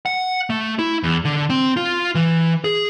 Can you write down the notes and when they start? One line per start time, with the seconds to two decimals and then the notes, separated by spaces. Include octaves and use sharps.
0.06 F#5
0.50 A3
0.79 E4
1.03 E2
1.25 D3
1.50 C4
1.77 F4
2.15 E3
2.64 G#4